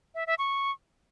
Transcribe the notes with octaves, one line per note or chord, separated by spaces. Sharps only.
E5
E5
C#6